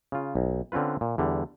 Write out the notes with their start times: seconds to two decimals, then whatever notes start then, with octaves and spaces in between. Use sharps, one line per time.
0.12 C#3 F4
0.35 B1
0.72 D3 C4 C#4 F4 B4
1.01 A#2
1.18 E2 D3 G3